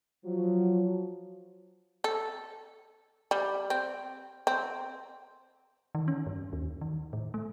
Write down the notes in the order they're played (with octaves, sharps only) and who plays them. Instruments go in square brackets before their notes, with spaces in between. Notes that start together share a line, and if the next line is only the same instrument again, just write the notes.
[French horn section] F3 F#3
[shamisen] A4
G3
C4
C4
[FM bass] D#3
C#4
G2
D#2
D#3
A2
A3